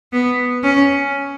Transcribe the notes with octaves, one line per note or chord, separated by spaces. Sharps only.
B3
C#4